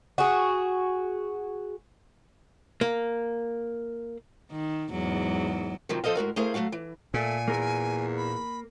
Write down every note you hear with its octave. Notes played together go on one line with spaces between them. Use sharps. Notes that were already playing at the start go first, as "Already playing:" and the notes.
F#4 G#4
A#3
D#3
E2 G#2 F#3
C3 D#3 F3 F#3
F3 A4 C5 D#5 F5
A2 G#3 F#4 A#4
A3 E4 G#4 A#4 C5 F5
F#3 G#3 A3 F#4 F5
E3
A#2 A3 G#5
E2 A#3 A#4
B5